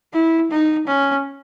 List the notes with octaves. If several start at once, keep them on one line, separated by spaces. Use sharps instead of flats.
E4
D#4
C#4